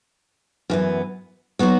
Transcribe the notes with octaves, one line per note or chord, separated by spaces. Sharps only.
F#2 E3 B3
F#3 B3 D#4 F#4